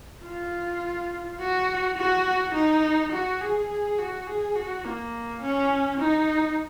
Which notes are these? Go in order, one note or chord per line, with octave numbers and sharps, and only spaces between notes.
F4
F#4
F#4
D#4
F#4
G#4
G#4
F#4
G#4
F#4
A#3
C#4
D#4